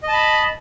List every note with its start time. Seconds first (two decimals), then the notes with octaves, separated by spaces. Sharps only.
0.03 D#5
0.08 A5
0.13 B5